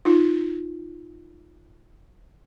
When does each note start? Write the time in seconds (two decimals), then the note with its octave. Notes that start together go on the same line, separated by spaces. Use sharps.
0.05 D#4 F4